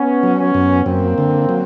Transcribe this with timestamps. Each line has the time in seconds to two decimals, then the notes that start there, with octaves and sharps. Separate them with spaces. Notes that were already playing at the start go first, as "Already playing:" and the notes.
Already playing: B3 C#4
0.23 F#3
0.39 B3 C#4
0.54 F#2
0.85 F#2 A#3 C4
1.18 D3
1.49 F#3